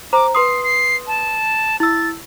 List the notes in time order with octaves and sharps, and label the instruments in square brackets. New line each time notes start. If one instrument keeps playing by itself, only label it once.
[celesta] C5 A#5 [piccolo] D6
[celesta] B4 C6 D#6 [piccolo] C7
[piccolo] C7
A5
[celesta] E4 E6 [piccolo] A6